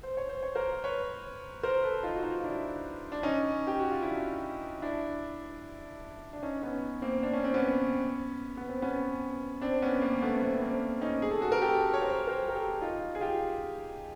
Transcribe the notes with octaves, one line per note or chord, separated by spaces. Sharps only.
C5
C#5
C5
C#5
A#4 C5
B4 C#5
A#4 C5
A4 B4
D#4 F4
F#4
D#4 F4
D4 E4
D4
C#4 D#4
G4
F#4
F4
D4 E4
D4 E4
D4
C#4 D#4
B3 C#4
A#3 C4
D4
C#4
C4
B3 C#4
B3
C4
B3 C#4
C4 D4
B3 C#4
A#3
A3 B3
C4
A3 B3
B3
A#3 C4
C#4 D#4
G#4
A4
F#4 G#4
A#4
G4 A4
C#5
A#4 C5
A#4 C5
A#4
G4 A4
D#4 F4
G#4
F4 G4